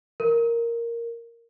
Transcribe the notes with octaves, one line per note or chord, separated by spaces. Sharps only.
A#4